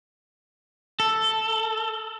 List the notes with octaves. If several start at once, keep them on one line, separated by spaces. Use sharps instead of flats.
A4